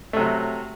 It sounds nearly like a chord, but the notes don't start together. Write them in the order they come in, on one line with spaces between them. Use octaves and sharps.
A3 C3 F#3